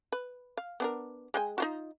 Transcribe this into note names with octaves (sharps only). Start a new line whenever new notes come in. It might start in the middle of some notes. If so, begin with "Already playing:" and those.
B4
F5
B3 D4 A#4
G#3 G5 G#5
D#4 F4 F#4